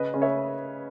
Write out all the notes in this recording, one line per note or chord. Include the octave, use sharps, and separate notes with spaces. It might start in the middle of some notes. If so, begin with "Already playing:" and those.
Already playing: C#3 B4 D#5
C#3
C#5 E5